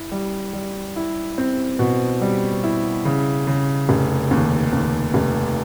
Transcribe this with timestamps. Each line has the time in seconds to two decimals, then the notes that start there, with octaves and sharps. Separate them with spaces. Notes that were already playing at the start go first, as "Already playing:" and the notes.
Already playing: E4
0.12 G3
0.53 G3
0.96 E4
1.38 C4
1.79 B2
2.21 G3
2.63 E4
3.05 C#3
3.47 C#3
3.89 F1
4.31 D#2
4.73 D#2
5.14 F1